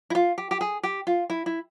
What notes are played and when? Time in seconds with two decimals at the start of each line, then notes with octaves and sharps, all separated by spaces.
0.10 E4
0.15 F4
0.38 G4
0.51 G4
0.61 G#4
0.83 G4
1.07 F4
1.30 E4
1.46 E4